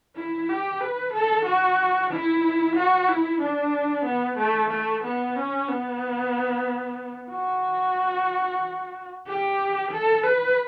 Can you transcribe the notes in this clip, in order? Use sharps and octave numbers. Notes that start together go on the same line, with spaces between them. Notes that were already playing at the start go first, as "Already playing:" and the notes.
E4
G4
B4
A4
F#4
E4
F#4
E4
D4
B3
A3
A3
B3
C#4
B3
F#4
G4
A4
B4